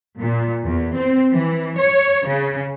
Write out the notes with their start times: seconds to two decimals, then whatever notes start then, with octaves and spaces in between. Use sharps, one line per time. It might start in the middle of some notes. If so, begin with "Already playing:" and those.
0.19 A#2
0.64 E2
0.96 C4
1.33 E3
1.79 C#5
2.27 C#3